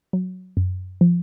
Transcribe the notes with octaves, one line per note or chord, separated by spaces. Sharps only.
F#3
F#2
F3